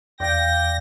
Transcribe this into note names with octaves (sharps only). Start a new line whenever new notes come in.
E2 D5 F5 G5 A#6